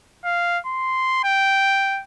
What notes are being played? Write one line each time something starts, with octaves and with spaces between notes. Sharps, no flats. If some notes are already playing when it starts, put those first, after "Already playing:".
F5
C6
G5